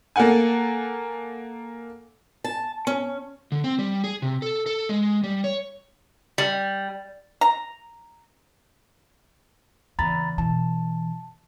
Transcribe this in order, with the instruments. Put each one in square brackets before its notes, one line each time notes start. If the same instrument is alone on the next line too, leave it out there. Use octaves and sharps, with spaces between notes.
[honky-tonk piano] A#3 A4 A#4 F#5 G#5
[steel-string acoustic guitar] A5
C#4
[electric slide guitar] D3
C4
G3
G#4
C3
A4
A4
G#3
G3
C#5
[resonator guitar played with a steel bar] G3
[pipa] A#5
[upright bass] E2 C#3 [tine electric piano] A#5 B5 A6
[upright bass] B2 E3 [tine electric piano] A5